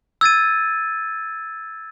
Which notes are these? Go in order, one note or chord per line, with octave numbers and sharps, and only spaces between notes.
E6 G#6 A6 D#7